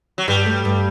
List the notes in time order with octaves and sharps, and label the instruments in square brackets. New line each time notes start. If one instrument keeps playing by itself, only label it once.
[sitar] F#3
[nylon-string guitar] G2 [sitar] G3
[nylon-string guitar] A3
G2